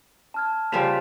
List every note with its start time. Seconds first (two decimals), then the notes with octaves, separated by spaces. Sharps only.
0.34 A5 F6 G#6
0.72 C#3 F3 G3 B6 E7 F7